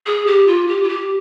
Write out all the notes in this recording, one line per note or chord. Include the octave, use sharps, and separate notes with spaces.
G#4
G4
F4
G4
F4
G4